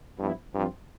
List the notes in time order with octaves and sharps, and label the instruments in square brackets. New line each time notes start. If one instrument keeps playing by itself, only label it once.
[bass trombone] G2 [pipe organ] F3 B3 E4
[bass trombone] G2 [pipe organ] F3 C4 F4